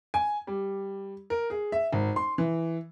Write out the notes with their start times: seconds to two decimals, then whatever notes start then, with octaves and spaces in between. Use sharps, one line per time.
0.14 G#5
0.47 G3
1.30 A#4
1.50 G#4
1.72 E5
1.93 G#1
2.16 C6
2.38 E3